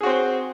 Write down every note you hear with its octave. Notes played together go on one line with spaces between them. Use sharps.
C4 F#4 G#4 C5